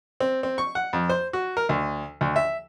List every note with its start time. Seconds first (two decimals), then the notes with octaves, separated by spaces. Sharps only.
0.20 C4
0.43 C4
0.58 C#6
0.75 F#5
0.93 F2
1.10 C5
1.33 F#4
1.57 A#4
1.69 D2
2.21 D2
2.36 E5